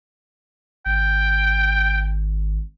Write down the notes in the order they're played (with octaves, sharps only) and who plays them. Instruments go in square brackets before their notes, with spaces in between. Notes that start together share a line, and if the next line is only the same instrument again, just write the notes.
[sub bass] G#1 [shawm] G5